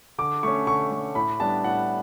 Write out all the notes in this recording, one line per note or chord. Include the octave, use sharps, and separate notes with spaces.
D3 D6
A3 C#4 C#6
D3 C#6
A3 C#4
A2 B5
G3 B3 D4 A5
A2 F#5